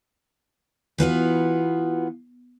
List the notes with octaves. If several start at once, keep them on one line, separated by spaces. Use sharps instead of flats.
E3 B3 F4 F#4